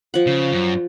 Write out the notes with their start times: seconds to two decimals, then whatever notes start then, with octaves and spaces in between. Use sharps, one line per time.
0.14 F3 F#5
0.27 C#3
0.53 F#2